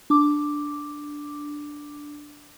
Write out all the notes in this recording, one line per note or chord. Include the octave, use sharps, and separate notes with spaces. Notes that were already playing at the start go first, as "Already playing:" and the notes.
D4 D6